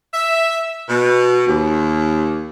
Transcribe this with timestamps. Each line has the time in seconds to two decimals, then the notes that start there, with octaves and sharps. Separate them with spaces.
0.14 E5
0.89 B2
1.47 D#2